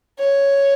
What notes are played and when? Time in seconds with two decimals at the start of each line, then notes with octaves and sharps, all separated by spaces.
0.19 C#5